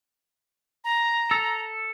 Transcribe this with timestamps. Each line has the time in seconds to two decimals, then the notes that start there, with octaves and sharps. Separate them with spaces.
0.84 A#5
1.31 A4